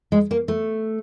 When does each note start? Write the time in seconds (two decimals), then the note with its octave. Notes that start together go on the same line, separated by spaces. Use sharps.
0.12 G#3
0.31 A#3
0.48 A3